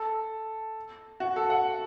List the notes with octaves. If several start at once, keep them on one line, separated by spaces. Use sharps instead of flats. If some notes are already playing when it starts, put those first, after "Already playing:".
Already playing: A4
F#4
A4
F#5